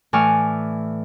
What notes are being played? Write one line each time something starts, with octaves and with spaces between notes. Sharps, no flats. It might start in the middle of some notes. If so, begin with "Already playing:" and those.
A2 E3 D5 G#5 C#6 F6